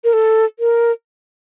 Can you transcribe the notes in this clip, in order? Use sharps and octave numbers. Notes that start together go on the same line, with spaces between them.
A#4
A4
A#4